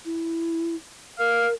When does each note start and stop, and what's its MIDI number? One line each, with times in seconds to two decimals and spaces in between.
0.05 0.75 64
1.19 1.54 70
1.19 1.48 77